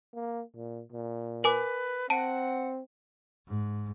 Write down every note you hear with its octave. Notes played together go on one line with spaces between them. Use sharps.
A#3
A#2
A#2
A#4 B4 G#5 D6
C4 F#5 A5 D7
G#2